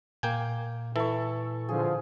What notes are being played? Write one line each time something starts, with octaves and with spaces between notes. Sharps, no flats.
A#2 A#3 G5 G#5
E3 A4 C#6
D3 F3 G#4